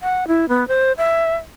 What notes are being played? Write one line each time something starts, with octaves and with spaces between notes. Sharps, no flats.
F#5
E4
B3
C5
E5